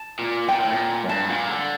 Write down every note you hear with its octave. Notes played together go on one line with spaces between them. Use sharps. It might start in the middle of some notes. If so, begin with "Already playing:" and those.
Already playing: A5
A#2
A#2 G5
A2
A#2
F#2
G2 A5
A#2
D3